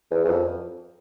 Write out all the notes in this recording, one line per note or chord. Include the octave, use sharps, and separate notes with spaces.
E2
E2
F2